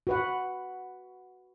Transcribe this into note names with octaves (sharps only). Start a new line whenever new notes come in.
F#4 B4 F#5